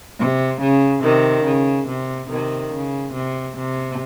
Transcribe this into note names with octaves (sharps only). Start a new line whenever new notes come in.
C3
C#3
C3 D#3
C#3
C3
C3 D#3
C#3
C3
C3